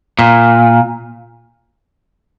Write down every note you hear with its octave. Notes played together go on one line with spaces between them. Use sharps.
A#2